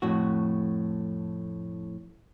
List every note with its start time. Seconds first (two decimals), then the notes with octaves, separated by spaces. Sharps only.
0.02 F2 A2 F#4